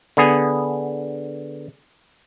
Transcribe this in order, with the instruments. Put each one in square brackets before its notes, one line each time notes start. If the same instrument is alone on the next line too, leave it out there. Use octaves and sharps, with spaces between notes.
[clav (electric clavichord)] D3 B3 G#4